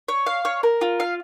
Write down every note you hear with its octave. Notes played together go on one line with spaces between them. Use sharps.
C#5
F5
C#5
A#4
F4
F5